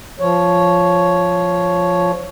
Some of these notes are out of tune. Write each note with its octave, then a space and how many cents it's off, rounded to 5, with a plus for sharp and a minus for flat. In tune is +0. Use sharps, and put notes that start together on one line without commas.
F3 +0 C#5 +0